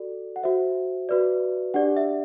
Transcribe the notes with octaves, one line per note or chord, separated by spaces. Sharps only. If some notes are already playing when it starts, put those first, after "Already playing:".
Already playing: F#4 A4 D5
F#5
F#4 C5 E5
F#4 B4 D5
D4 G4 D5 F#5
E5